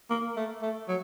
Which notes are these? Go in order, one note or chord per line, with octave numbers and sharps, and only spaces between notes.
A#3
A3
A3
F#3